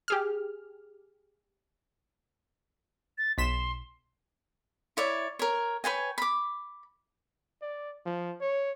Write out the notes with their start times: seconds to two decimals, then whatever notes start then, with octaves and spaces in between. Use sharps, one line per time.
0.08 G4 G#4 F6
3.18 A6
3.38 B1 C6 B6 E7
4.97 E4 C#5 D5 E5
5.39 A#4 C#5
5.84 B4 C#5 G5 G#5
6.18 B5 D6
7.62 D5
8.06 F3
8.41 C#5